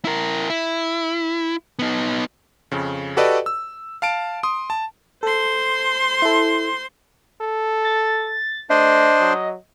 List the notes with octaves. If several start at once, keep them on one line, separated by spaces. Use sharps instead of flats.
E4 A#4
E4
B3 D#4
F2 C#3
F#4 G4 A4 B4 D5 D#5
E6
F5 A5 D7
C6 D#6
A5
A4 C5 C6
E4 A4
A4
A6
A3 D4 C5 D#5
F#3